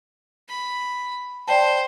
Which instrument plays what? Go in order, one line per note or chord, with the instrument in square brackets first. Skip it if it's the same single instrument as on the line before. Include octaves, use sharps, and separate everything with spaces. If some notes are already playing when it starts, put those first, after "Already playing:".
[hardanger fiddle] B5
[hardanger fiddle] C5 [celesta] D5 G5 A5